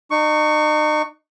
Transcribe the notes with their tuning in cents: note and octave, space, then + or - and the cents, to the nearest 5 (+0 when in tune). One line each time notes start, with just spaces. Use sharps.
D#4 -35 C#6 +10